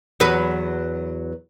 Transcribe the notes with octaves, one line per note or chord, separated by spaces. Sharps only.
E2 F#3 B4